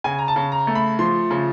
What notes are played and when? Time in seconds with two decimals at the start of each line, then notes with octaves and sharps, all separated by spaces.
0.04 C#3 G#5
0.19 A#5
0.28 A5
0.36 C#3
0.52 A#5
0.67 A3
0.75 B5
0.99 F3 C6
1.31 C#3